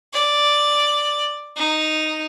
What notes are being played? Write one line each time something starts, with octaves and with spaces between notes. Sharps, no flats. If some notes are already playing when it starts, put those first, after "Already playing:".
D5
D#4